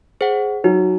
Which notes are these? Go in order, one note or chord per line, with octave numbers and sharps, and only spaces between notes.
G#4 C5 F#5
F#3 D#4